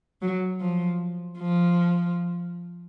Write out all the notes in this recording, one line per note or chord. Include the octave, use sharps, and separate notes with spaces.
F#3
F3
F3